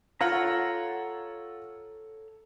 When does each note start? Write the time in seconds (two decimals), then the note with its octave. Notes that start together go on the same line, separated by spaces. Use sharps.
0.21 F4 A4 C#5 F#5 A#5